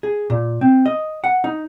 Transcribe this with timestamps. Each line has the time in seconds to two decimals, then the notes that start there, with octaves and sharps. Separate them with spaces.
0.03 G#4
0.30 A#2
0.61 C4
0.86 D#5
1.24 F#5
1.44 D#4